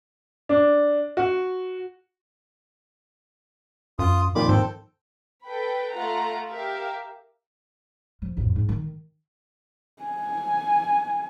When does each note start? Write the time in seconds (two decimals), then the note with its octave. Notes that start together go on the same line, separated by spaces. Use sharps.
0.49 D4
1.17 F#4
3.99 F#2 F4 D#6
4.35 F2 A#2 D#3 F4 B5 D6
4.49 G#2 C4 A4 G5
5.46 A4 B4 G5 B5
5.94 A3 F4 F#5 A#5
6.48 G4 A#4 E5 F5
8.22 F3
8.37 A1 F2
8.56 G#2
8.69 D#3
10.03 G#5